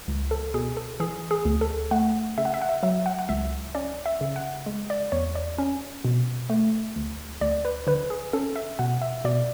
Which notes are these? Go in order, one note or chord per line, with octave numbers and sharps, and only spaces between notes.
C#2
A4
B2 G#4
A4
E3 G#4
G#4
D2
A4
A3 F#5
C#3 E5
F#5
E5
F#5
E5
F#3 E5
F#5
F#5
C#2 E5
C#4 D5
E5
C#3
F#5
G#3
D5
E2 C#5
D5
C#4
B2
A3
D2
D2 D5
B4
D3 B4
G#4
C#4 A4
E5
B2 F#5
E5
B2 D5